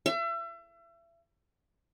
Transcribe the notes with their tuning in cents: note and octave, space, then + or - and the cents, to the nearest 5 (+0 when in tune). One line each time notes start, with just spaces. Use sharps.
E5 +35